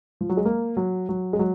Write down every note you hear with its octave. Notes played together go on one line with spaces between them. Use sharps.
F3
F#3
G#3
A#3
F#3
F#3
G#3
F#3